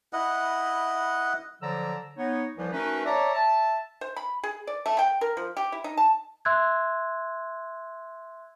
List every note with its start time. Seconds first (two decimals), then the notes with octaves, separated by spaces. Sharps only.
0.13 E4 B4 D#5 F#5
1.62 D3 F3 F#3 D5 A#5 E6
2.17 B3 D#4 C#5
2.57 C2 E3 F3
2.73 A3 C#4 D#4 F#4 A#4 B4
3.05 C#5 D5 E5 A5 A#5
3.34 E5 A5
4.01 C5
4.16 B5
4.43 G#4
4.67 D5
4.86 A3
4.99 G5
5.21 A#4
5.37 F3
5.57 G4
5.72 E4
5.84 D#4
5.97 A5
6.45 E5 C6 E6 F#6 G#6